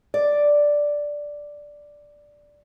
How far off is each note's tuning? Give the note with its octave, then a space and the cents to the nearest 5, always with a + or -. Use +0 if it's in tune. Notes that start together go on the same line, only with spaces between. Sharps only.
D5 +0